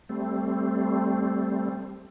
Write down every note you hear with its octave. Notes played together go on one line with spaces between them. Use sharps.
G3 A3 C4